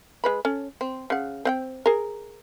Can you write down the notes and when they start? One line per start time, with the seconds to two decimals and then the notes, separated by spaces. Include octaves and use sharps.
0.24 G#3 B4 B5
0.45 C#4 A4
0.81 C4
1.10 C#3 F#5
1.45 C4 F#5 G5
1.86 G#4 A#4